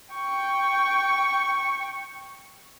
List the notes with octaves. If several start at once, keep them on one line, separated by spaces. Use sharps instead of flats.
G5 C#6